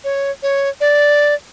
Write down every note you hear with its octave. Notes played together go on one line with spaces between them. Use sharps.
C#5
C#5
D5